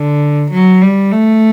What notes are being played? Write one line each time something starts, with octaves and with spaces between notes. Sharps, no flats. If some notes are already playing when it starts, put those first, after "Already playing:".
Already playing: D3
F#3
G3
A3